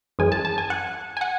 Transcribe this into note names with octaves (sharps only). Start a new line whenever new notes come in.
F#2 E3 G#3 G#5
A5
A5
G#5
F#5
G#5
F#5